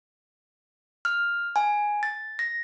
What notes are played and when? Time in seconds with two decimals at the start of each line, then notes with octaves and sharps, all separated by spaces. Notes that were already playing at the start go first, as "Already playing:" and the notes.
1.05 F6
1.56 G#5
2.03 A6
2.39 A#6